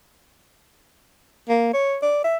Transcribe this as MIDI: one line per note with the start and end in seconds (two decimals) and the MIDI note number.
1.49 1.71 58
1.74 1.97 73
2.02 2.19 74
2.24 2.37 76